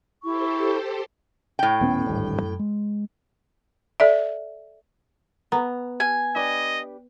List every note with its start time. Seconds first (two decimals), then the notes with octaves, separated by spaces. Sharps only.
0.24 E4 G4 A4 C5 C#6
1.59 A2 G5
1.81 D#1 B3 C#4
2.06 D1 G#1 G2
2.42 F#2
2.59 G#3
4.00 A4 D5 E5
5.52 B3 A#5
6.00 G#5
6.35 D4 G4 B4 D#5